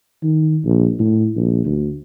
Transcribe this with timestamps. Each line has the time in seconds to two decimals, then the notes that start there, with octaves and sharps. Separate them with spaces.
0.23 D#3
0.65 A#1
1.00 A2
1.36 A#1
1.65 D2